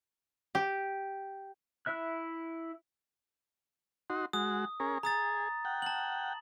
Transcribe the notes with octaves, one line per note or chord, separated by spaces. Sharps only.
G4
E4 E5 F#6
D#4 F#4 C6
G#3 F#4 D#6
C#4 G#4 A#4
G#4 A#5 D#6 A6
F#5 G5
A5 F#7